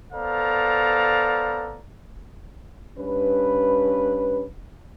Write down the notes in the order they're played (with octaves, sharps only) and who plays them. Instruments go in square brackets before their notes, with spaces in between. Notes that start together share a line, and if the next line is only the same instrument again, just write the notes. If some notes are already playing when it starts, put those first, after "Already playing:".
[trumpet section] B3 A4 C5 D5 F5 A#5
[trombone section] G2 C#4 B4